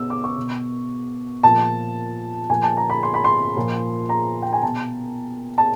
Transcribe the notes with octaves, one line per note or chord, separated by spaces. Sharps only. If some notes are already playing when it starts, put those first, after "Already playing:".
Already playing: B2 E6
D6
C#6
B2
A#2 F3 A5
A#2 F3 G#5
A5
A#5
B5
C6
B5
C6
A#2 F3
A#5
G5
G#5
B2 A5
A5